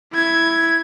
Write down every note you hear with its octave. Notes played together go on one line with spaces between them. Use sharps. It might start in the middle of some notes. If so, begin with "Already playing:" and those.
E4 G#6